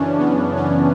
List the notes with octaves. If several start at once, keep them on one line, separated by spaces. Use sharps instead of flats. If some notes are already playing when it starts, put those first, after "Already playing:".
Already playing: F#2 C#3 E3 C#4 D4
B3
C#4